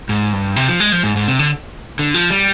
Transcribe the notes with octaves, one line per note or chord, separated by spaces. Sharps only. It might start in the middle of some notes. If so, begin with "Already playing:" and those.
G#2
G2
C3
F3
G#3
F3
G#2
G#2
C3
D3
D3
F3
G3